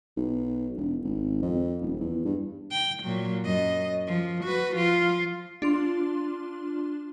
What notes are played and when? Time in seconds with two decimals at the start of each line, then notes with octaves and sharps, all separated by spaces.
0.17 B1
0.77 E1
1.04 G#1
1.42 F2
1.81 D#1
2.00 E2
2.25 G2
2.72 G5
3.04 A#2 F#3
3.44 F#2 D#5
4.08 F3
4.44 F#4 B4
4.75 F3 F4
5.62 D4 F4 C6